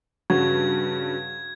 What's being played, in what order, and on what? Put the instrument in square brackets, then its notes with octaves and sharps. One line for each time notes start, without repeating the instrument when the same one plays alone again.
[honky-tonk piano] G2 C#3 [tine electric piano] F#4 [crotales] G#6